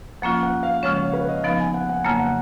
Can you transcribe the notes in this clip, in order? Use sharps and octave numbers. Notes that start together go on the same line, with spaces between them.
F3 A#3 C#4 F4 F#5
F#5
F5
C#3 F3 G#3 C#4 C#5
C#5
B4
D#5
F3 B3 D#4 F5
G#5
F#5
F#5
F2 C#3 F#3 A#3 G#5
F#5